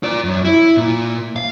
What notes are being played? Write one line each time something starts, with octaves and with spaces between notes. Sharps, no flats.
F4 D5
F#2
E4
A#2
F5